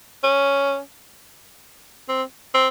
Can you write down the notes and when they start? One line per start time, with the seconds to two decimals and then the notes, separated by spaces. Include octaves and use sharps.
0.24 C#4
2.09 C4
2.54 C4